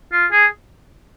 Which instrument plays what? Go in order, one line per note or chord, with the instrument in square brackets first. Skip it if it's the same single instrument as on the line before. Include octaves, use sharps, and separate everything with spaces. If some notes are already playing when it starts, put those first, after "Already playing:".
[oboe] F4
G#4